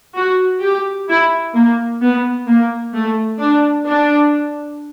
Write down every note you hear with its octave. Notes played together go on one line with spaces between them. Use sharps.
F#4
G4
E4
A#3
B3
A#3
A3
D4
D4